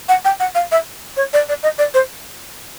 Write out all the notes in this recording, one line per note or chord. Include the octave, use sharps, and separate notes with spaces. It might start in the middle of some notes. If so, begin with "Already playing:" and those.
F#5
G5
F#5
F5
E5
C#5
D5
D5
D#5
D5
C5